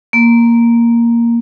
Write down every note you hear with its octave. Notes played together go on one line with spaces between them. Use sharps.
A#3